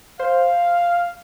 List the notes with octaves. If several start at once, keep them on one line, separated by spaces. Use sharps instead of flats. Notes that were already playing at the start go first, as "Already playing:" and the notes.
C5 F5